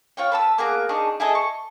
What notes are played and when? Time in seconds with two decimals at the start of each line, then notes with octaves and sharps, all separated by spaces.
0.17 F4 C#5 G5
0.32 B4 A5 E6
0.58 A#3 B3 G#4 A#5
0.89 D4 D#4 G#4 C#6
1.20 E4 G#4 A4 D#5
1.35 C#6